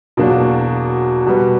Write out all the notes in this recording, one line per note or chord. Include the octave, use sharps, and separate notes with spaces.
E2 B2 F#3 A#3 D4
B2 G3 B3